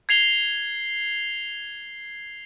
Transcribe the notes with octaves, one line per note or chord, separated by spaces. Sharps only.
G#6 C7 F7 G7